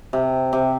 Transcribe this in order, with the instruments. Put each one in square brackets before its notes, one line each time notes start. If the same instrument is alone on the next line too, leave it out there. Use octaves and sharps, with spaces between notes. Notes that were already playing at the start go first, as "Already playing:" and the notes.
[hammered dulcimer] C3
C3